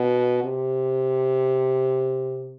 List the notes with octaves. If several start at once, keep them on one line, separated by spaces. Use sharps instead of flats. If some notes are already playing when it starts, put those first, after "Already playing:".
Already playing: B2
C3